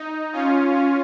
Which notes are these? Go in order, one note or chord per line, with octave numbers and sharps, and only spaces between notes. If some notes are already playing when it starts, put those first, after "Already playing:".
Already playing: D#4
C#4 F4
C#4